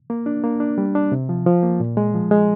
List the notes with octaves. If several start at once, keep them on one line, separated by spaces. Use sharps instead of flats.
A#3
D4
A#3
D4
G3
D4
C3
F3
F3
A#3
A#2
G#3
F3
G#3